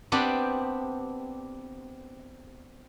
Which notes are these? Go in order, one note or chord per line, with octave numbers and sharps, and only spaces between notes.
B3 C4 D4 G4 D5